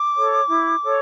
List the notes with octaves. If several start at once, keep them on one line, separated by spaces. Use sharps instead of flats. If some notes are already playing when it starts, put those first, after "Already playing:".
Already playing: D6
A4 C#5
E4
A4 C#5